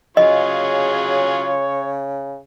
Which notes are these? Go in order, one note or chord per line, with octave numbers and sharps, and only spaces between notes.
C#3 F#3 F4 G#4 C#5 D#5